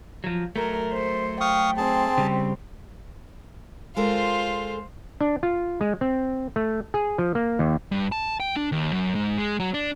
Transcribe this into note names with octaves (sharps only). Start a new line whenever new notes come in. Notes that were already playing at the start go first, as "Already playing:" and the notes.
F3 F#3
F#3 A3 A#4
C5
F5 G5 C#6 D#6
C4 G#4 A5
C#3 G3
G#3 F4 A4 A#4 C5
D4
F4
G#3
C4
A3
G#4
F3
A#3
D#2
G2
A5
G5
D4
D#2
F#2
G#2
G#3
F#3
D4